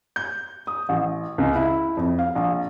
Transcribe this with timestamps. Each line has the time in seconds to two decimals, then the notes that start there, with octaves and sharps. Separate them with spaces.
0.16 G6
0.67 D#6
0.89 A1
1.38 C#2
1.55 E4
1.97 F2
2.19 F5
2.35 A#1